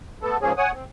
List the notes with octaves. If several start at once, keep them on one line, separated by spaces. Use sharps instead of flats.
A3 B3 A4
G#2 C#3 F3 A#3 C#4 G#4
C#5 F#5 G#5 D#6
C4